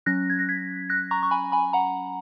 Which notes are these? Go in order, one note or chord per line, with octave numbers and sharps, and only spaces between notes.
F#3 C#4 F#6 A#6
G#6
A#6
G#6 B6
F#6 A#6
A#5 C#6
C#6
G#5 B5
G#5 B5
F#5 A#5